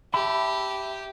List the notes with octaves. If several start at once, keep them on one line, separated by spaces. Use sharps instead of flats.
G4 E5 A5 B5